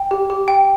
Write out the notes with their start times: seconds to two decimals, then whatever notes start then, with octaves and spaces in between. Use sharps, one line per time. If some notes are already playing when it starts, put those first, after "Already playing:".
Already playing: G5
0.11 G4
0.30 G4
0.48 G5